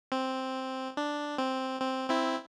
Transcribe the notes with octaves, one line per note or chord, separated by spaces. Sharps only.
C4
D4
C4
C4
C4 E4